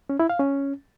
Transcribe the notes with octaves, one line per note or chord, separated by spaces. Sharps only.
C#4
E4
F5
C#4